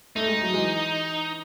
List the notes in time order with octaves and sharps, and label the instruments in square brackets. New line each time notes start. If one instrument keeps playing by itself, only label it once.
[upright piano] A3 [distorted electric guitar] D#4
[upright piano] G#3
F#3
E3 G#3